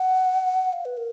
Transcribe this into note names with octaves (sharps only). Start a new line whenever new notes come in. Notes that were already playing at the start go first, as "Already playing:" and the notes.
Already playing: F#5
F5
B4
A#4